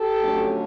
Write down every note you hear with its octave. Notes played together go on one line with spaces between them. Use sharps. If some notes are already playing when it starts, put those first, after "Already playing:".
Already playing: G4 A4
F2 D3 F#3 A3 C#4